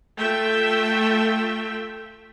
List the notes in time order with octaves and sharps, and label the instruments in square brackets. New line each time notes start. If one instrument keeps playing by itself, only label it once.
[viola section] A3 F4 E5 G5